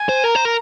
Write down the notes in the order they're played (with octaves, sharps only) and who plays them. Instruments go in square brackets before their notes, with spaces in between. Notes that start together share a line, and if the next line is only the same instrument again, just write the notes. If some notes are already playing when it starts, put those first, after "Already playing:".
Already playing: [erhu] G#5
[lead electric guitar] C5
[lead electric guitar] A#4 [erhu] A#5
[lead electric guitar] C5
A#4